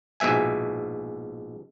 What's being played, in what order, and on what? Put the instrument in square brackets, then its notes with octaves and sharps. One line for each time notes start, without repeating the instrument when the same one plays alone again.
[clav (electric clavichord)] A#1 G#2 B2 E5 G#5